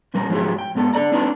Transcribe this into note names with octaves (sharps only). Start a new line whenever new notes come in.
F2 A#2 G3 A#4
G#2 F3 F#3 D#4 G4 G#4
G5
G#2 B3 A4
D4 A4 D5 A#5
A#3 C4 D4 D#4 B4